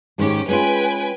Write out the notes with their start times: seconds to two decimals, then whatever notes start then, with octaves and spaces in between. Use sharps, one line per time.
0.18 G#2 D#3 G#3 C#4 G4
0.48 G#3 C#4 F4 B4 G5 G#5